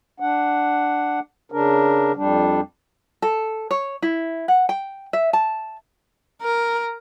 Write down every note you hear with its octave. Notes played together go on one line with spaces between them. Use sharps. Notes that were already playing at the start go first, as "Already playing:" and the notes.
D4 F#5
C#3 D4 A#4
F2 G3 D4
A4
C#5
E4
F#5
G5
E5
A5
A#4